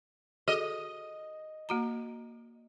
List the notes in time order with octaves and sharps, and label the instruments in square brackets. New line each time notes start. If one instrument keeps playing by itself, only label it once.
[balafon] F#4 G#4 A4 [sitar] D#5
[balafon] A#3 F#4 A#5